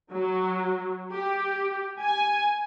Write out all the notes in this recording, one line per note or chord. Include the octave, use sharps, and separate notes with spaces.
F#3
G4
G#5